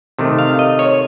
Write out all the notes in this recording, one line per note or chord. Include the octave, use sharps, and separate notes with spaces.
C3 D#3 A3
F5
D#5
C#5